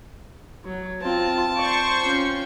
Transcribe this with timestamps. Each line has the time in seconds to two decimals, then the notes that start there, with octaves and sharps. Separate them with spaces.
0.64 F#3
1.02 C4 F4 A5
1.56 C5 D5 C#6
2.03 C#4 F4 G5